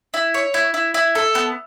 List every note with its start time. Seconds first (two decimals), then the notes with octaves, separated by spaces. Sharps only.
0.14 E4
0.34 C#5
0.54 E4
0.74 E4
0.94 E4
1.15 A4
1.35 B3